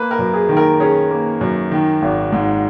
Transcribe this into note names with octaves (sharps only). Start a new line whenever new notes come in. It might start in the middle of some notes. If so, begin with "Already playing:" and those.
Already playing: A#3 B4
A#4
F#2
G#4
D#3
A#4
C#4 G#4
A#3
F#2
D#3
G#1
G#2